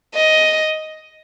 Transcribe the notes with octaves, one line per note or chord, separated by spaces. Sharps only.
D#5